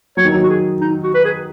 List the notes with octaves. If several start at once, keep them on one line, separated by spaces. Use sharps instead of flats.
F#3 C#5
D#3
F#3
F#4
G#4
D#4
F#4
B4
G#4